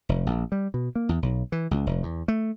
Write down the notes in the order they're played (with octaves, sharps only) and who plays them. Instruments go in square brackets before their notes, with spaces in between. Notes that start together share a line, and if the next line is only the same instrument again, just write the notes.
[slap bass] F1
A#1
G3
B2
A#3
E2
B1
E3
C#2
F1
E2
A3